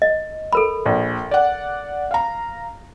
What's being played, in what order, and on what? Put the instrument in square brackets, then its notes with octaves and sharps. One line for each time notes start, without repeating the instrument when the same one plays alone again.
[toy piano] D#5
A4 A#4 B5
[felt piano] A#1
D5 F#5
F5 A#5